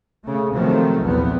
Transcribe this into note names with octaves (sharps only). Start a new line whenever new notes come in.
C#3 A3
C3 D#3 F3 F#3 G#3 A3
A#1 E2 B3 C4